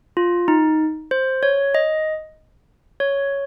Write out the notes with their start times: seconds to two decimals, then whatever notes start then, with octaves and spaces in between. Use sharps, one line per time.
0.17 F4
0.48 D#4
1.11 C5
1.43 C#5
1.75 D#5
3.00 C#5